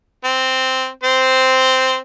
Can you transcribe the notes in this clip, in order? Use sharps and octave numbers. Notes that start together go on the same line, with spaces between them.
C4
C4 C5